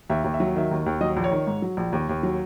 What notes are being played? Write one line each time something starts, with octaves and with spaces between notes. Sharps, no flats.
D#2 E5
D#2
E5
F#3
D#3 E5
D#2
D#2
F#3 D#5
A#1
C#5
D#3
G#2
F#3
A#1
D#2
D#2
F#3